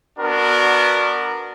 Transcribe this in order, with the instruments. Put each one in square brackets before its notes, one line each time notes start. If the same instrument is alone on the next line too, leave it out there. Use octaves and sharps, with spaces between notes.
[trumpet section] B3 D4 F#4 A#4